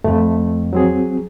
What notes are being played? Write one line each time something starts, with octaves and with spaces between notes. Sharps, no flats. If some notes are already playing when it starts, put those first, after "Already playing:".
F2 G#2 A3
F#3 C4 G#4